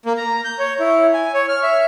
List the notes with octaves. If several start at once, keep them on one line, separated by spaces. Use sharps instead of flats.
A#3
A#5
G6
C#5
E4
G#5
C#5
F6
E5